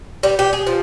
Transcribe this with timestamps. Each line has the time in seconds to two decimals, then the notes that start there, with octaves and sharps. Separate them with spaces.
0.23 G3
0.39 G4
0.53 G#4
0.67 F3